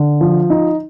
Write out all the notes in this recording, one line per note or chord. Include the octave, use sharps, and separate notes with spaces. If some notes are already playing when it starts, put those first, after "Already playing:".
Already playing: D3
F3
D#4